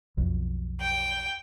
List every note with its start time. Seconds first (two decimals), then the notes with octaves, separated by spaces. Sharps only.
0.17 B1 F2
0.81 G5